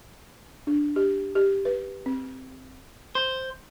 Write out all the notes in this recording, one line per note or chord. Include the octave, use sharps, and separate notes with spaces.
D4
G4
G4
B4
C4
C5